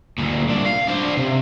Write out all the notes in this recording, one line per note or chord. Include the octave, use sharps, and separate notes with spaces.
D2 A#2
C2 D4
F5
D4 C5
C3